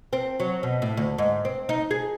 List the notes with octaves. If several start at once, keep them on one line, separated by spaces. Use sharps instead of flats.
C4
F#3
B2
A2
D2
G#2
C4
D#4
G#4